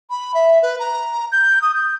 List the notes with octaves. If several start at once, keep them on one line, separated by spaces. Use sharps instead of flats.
B5
E5
B4
A#5
G6
D#6
G6